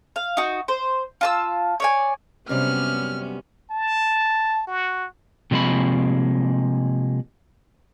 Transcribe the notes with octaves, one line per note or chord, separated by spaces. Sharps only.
F5
D#4 F#4
C5
F4 A5 E6
C#5 D5 G#5
F#2 C3 G3 B3 C#4 F6
A5
F#4
C3 F3 G#3 A#3 B5